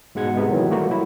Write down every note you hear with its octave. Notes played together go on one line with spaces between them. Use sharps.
G#2 B2 G#3 F#5 G#6
C3 B3
D#3 E3 F#3
G3 A3 A#3 F4 F#4
F#3 E4